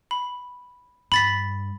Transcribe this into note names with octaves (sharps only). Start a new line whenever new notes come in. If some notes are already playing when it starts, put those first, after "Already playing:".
B5
G2 B5 A6 B6